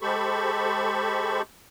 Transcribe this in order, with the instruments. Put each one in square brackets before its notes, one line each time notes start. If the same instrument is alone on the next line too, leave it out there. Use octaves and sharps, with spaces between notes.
[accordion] G#3 G4 A4 C5 B5 C#6